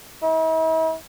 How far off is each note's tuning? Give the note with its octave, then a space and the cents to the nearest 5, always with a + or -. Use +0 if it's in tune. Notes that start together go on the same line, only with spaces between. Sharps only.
E4 -45